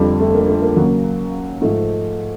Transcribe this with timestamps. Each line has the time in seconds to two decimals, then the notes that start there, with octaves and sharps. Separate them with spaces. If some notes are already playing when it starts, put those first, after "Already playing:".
Already playing: F2 D3 G3
0.20 A3
0.35 A#3
0.49 A3
0.62 A#3
0.77 D#2 C#3 F#3
1.61 G#2 F3 G#3 A3